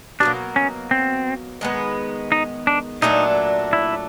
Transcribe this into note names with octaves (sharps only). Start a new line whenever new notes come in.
B2 F#3 A#3 D4
C#4
C4
D#3 G#3 B3
D#4
D4
A#2 F#3 A3 D4 D#4
E4